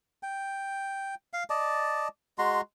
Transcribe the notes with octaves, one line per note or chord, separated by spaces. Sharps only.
G5
F5
D5 D#5 A5
G#3 F#4 A#5 C6